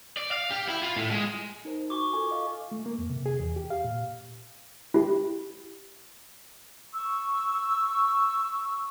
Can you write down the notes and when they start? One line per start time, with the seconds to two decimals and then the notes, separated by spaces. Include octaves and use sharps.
0.17 D5
0.31 F5
0.51 G4
0.69 E4
0.83 F4
0.96 A2
1.11 G#3
1.50 G#5
1.65 D#4 A#4 C5
1.90 F#4 G#5 C#6 D6
2.13 F4 A4 G#5
2.31 D#5 F5
2.72 A3
2.86 A#3
2.98 F2
3.10 C3
3.26 G#4
3.39 E2
3.56 G4
3.70 F5
3.84 A#2
4.94 E4 G4
6.93 C#6 E6